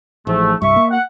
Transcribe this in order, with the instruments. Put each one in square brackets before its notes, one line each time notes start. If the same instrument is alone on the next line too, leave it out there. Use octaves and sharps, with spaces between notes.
[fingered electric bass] A1 [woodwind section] G#2 F3 A3
[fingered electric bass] C2 G2 [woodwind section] E5 C#6
[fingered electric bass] A#3
[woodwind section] F#5